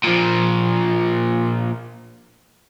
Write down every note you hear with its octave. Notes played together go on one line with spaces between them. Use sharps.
A#2 F3